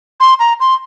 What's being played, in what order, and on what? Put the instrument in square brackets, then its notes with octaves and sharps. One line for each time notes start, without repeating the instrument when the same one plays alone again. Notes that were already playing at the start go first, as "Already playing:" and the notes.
[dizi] C6
A#5
C6